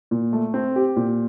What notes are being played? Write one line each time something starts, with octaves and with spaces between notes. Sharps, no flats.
A#2
A3
C4
G4
A#2